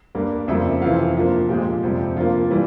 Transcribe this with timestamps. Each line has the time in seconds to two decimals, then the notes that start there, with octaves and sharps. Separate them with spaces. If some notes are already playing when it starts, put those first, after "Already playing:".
0.15 G2 G3 A#3
0.48 F2 C#3 G3 A#3 E5
0.82 F2 C3 E3 F5
1.16 G2 F3 A#3
1.49 A#2 F3 G#3 G4
1.83 F2 C3 G3
2.16 G2 F3 A#3 F4
2.51 E3 G3